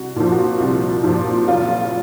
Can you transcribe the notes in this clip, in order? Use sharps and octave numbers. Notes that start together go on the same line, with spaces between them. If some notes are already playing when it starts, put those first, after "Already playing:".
Already playing: C2 F#4
A#2 F3
F#4
C2
A#2 F3
F#1 F4